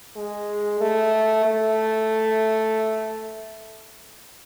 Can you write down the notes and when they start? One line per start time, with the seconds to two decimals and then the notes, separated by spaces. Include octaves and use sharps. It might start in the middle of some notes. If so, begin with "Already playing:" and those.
0.16 G#3
0.81 A3
1.45 A3